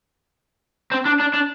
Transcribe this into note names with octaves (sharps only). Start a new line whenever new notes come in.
C4
D4
D4
D4